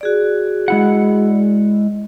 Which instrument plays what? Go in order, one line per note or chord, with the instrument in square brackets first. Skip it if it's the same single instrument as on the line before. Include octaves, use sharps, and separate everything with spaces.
[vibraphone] F#4 G#4 D5
[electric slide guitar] G#3 E4 F#5